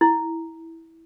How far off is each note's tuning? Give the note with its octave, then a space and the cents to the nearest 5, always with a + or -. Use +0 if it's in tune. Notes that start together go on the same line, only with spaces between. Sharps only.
E4 -10